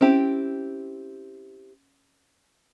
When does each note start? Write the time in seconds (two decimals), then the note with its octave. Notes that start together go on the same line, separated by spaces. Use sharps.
0.01 C4 C#4 E4 G4